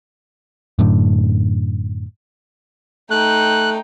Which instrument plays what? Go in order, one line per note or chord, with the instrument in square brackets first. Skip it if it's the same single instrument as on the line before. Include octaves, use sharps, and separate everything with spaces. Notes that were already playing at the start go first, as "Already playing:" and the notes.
[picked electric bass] F#2 A2 D3
[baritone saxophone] A3 [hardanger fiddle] D#4 G5 [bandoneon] F#6